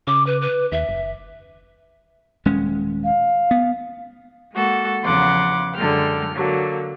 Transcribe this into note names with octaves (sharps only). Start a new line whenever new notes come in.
C#3 D6
B4
B4
D#2 E5
F#1
D#1 G#3 C#4
F5
B3
G#3 A#3 F#4 A4
E2 C#3 F3 F#5 C6 D6
F#2 D3 F#3 G#3 G5 F6
D3 F#3 A#3